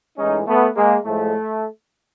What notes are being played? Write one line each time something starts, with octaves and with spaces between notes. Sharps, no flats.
A2 E3 G#3 C#4 D#4
A3 B3
G#3 A#3
A2 F3 G#3 A3